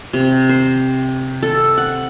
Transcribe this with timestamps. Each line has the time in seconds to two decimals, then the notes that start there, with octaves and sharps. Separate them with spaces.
0.13 C3
0.49 C5
1.43 A4
1.78 F#5